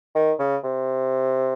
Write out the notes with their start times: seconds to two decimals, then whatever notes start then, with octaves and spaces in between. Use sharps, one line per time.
0.15 D#3
0.39 C#3
0.64 C3